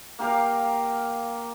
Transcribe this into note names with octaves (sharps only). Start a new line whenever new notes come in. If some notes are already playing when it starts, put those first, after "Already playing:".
A#3 G4 F5 A#5